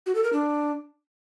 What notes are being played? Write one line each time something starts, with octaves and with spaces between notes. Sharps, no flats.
F#4
A4
A#4
D4